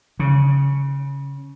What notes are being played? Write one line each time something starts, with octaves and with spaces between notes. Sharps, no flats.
C#3